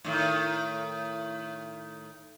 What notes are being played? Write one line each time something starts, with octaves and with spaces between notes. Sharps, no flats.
A2 D#3